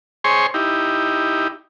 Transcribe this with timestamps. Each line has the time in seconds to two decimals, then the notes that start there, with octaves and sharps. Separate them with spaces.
0.24 G#4 C5 C#5 G#5 C6 C#6
0.54 D#4 E4 G4